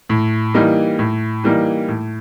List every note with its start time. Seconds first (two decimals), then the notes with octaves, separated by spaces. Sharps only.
0.09 A2
0.54 E3 G3 A#3 D#4
0.99 A2
1.44 E3 G3 A#3 D#4
1.88 A2